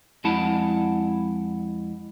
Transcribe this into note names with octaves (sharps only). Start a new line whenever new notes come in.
F2 G#3 E4 F#5 A5